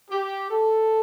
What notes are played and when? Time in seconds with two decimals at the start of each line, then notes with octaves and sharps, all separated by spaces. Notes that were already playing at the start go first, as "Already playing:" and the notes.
0.09 G4
0.49 A4